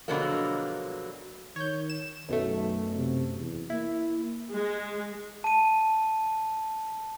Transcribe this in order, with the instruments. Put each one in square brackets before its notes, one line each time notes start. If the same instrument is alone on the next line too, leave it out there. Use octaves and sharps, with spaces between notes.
[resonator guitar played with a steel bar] B2 D3 F3 F#3 G#3 A#3
[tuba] D#3 [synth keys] C#5 G6
[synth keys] E7
[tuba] B1 [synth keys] F#2 B2 A3
[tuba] C3
E2
[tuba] A#3 [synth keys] E4
[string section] G#3
[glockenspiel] A5 D#7